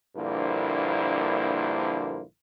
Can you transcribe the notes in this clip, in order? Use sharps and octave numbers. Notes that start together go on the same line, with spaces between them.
A#1 G2 D3 A#3 E4 C5